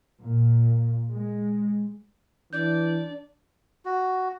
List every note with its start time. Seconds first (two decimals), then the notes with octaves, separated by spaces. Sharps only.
0.22 A#2
1.10 G#3
2.53 E3 D4 D5 G6
3.85 F#4